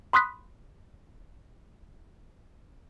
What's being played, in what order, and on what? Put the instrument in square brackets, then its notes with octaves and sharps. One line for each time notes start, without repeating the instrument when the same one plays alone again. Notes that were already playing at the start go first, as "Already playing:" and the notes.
[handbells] B5 C6 D#6 F#6 B6